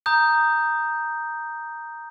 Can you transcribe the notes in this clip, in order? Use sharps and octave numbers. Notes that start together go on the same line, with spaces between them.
A#5 D#6 G6